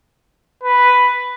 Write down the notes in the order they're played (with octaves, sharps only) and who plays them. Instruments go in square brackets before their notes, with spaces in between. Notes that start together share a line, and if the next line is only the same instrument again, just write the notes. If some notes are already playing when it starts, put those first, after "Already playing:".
[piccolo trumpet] B4